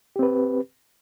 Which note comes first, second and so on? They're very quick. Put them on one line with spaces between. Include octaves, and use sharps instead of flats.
G4 C4 B4